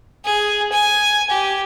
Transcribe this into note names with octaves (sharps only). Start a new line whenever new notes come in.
G#4
G#5
G4